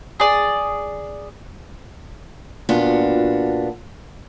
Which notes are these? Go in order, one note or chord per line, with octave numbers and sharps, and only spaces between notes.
G#4 D5
A#2 B3 D4 F4 F#4